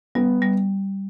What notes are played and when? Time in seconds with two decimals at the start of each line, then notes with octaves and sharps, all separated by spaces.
0.15 G3 B3
0.42 G3